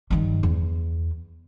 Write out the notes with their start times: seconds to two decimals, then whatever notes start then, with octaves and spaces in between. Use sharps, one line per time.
0.10 G2 D#3
0.43 E2